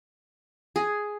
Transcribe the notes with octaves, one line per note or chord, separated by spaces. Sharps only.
G#4